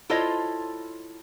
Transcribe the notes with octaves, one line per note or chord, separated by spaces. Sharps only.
E4 F4 A4 C5 C#5 D#5